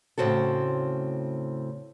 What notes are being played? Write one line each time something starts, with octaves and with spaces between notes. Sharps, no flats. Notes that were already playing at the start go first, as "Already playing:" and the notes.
A2 C#3 C4 F#4 A4